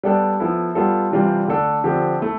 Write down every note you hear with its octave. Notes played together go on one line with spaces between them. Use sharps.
G3 B3 D4 A4
F3 B3 E4 A4
G3 B3 F4 A4
C3 E3 G3 D4 F4
D3 A3 D4 A4
D3 F3 C4 G4
A3 E4